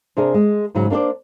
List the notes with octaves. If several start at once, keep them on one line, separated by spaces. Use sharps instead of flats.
C3 D4 G#4 A#4
G#3
G#2 C#3 F#3 F#4
A#3 D4 F#4 C5 D5